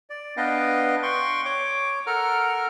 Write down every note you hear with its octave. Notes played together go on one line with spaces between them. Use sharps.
D5
B3 D4 B4 D#5 F5 G5
G5 C6 C#6
C#5 D6
A4 A#4 F#5 A#5 F6